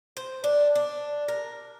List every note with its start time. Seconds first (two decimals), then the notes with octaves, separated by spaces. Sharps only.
0.17 C5
0.44 D4
0.75 D4
1.28 A#4